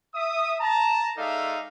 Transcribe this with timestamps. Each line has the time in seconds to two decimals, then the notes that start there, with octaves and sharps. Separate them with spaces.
0.15 E5 D#6
0.60 A5 A#5
1.17 G#3 D#4 A4 D5 E5 F5